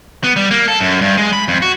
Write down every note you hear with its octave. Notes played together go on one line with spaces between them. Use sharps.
B3
G3
A#3
A4
F#2
G2
G#3
B5
F2
F#4